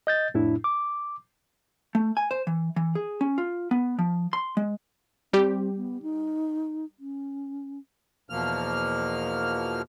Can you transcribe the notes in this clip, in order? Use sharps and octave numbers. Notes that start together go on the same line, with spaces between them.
D#5 G6 A6
F2 A2 D4 E4
D6
A3
G#5
C5
E3
E3
G#4
C#4
F4
B3
F3
C6
G#3
G3 C4 G4
B3
D#4
C#4
E2 B2 F3 A#3 F6